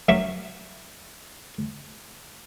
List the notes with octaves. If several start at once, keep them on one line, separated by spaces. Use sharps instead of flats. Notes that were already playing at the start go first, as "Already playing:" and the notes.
F#2 F#3 E5 C#6 D6